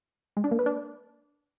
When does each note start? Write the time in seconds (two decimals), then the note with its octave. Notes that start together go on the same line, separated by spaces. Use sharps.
0.37 G#3
0.44 D4
0.51 A#3
0.59 B4
0.66 D4